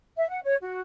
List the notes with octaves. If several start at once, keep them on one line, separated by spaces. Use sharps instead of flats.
E5
F#5
C#5
F#4